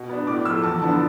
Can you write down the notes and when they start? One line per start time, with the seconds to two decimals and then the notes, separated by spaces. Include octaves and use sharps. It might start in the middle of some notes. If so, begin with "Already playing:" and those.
Already playing: B2
0.09 B3 D4
0.27 A2 D6
0.45 F3 A3 E6
0.63 E2 A5
0.82 D3 F3 B3 D4 A5